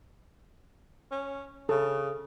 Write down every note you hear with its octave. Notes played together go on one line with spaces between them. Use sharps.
C#4
C#3 A4